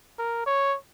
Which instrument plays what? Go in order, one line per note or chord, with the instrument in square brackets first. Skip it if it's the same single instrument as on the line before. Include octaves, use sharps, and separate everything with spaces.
[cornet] A#4
C#5